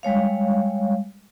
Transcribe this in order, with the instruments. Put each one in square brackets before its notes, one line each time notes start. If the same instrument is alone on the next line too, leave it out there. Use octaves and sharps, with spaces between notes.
[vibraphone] G3 G#3 C#5 F5